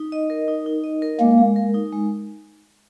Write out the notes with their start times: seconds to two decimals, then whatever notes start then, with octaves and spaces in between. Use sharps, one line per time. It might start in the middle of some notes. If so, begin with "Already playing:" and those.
Already playing: D#4
0.12 D#5
0.30 A#4
0.48 D#4
0.66 D#4
0.84 D#5
1.02 A#4
1.20 G#3 A#3
1.38 G#3
1.56 A#4
1.74 D#4
1.92 G#3